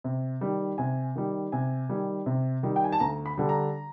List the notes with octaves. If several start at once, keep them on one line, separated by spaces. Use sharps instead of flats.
C3
D#3 G3
C3 G#5
D#3 G3
C3 G#5
D#3 G3
C3
D#3 G3
G5
G#5
A5
D2 A#5
B5
D3 G3
A#5